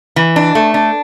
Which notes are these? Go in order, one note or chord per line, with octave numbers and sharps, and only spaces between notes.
E3
D4
A3
D4